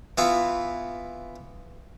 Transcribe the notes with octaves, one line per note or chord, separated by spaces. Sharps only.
E3 B3 F4 E5